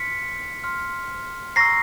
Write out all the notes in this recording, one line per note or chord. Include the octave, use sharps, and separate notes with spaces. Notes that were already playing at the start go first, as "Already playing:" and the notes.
Already playing: C6 F6 B6 C#7
C6 F6
A#5 C#6 E6 A#6 C7